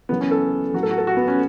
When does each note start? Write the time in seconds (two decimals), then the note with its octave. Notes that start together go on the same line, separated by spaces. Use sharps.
0.09 F#2 C#3 E3 B3
0.21 C#4
0.31 A4
0.74 A2 F#3 F#4
0.83 A4
0.91 F#4
0.98 A4
1.07 F#4
1.17 B3
1.28 C#4